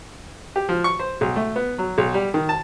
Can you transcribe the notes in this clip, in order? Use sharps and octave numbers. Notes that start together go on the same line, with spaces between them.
G4
F3
C#6
C5
B1
A3
B3
F#3
B1
G3
D#3
A5